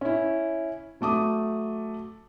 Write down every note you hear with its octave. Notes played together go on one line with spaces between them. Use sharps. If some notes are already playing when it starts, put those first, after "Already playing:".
C#4 E4
F#3 A3 D6 D#6